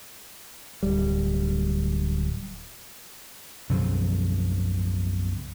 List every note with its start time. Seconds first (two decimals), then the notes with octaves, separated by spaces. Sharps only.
0.83 D1 G3
3.69 B1 F#2 C#3 F3